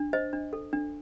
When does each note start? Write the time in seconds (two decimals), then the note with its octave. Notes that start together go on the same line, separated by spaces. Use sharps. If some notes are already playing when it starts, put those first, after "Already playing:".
Already playing: D4
0.13 C5 D#5
0.33 D4
0.53 A4
0.73 D4